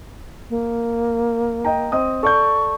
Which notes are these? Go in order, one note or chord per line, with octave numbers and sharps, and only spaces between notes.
A#3
D#5 G5 A#5
C4 D#5 D#6
A4 D5 C#6 G6